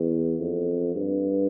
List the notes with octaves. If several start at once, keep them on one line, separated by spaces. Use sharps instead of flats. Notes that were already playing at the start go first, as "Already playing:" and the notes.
Already playing: E2
F2
G2